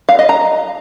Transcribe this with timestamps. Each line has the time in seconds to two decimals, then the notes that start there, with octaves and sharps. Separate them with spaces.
0.09 F5
0.19 D#5
0.29 A#5